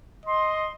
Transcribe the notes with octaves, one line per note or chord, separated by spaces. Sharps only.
D#5 C6